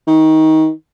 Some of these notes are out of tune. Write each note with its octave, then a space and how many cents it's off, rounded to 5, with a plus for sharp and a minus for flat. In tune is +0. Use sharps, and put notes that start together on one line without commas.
D#3 +20